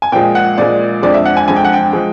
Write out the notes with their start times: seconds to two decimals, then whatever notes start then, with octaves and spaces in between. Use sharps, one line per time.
0.02 G#5
0.12 A#2 F3 G#3 G5
0.35 F#5
0.58 A#2 F3 G#3 D5
1.03 F2 D3 F3 G#3 D5
1.14 E5
1.25 F#5
1.37 G#5
1.48 F2 D3 F3 G#3 G#5
1.56 G5
1.65 F#5
1.73 G5
1.93 F3 G#3